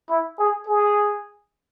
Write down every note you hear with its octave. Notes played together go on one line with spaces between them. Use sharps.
E4
G#4
G#4